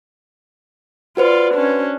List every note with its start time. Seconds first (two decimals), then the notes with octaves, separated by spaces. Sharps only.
1.17 F4 F#4 B4 C5 D5
1.54 C#4 D4